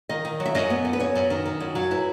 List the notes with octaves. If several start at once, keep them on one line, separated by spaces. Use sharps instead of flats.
D#3 D#5
D#3
F#3
E5
F#2 D#5
B3
F#2
B4
B3 C#5
F#2
D#3
D#3
F#2
F#3
E4 B4